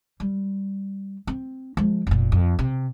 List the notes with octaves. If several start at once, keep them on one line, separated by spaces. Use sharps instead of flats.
G3
C4
F3 G#3
F1 A#2
F2
C3